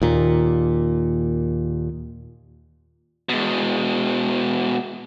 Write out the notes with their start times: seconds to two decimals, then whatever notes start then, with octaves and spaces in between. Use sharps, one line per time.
0.02 D#2 A#2
3.29 B2 G#3